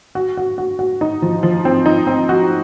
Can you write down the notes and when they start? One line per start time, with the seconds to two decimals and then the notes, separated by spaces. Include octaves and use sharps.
0.15 F#4
0.37 F#4
0.58 F#4
0.79 F#4
1.01 D#4
1.22 F3
1.43 F3
1.65 C4
1.86 D#4
2.07 C4
2.29 F#4